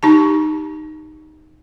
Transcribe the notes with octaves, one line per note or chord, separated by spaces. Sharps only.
D#4 G4 A5